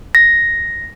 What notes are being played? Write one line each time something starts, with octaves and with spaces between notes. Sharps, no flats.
A#6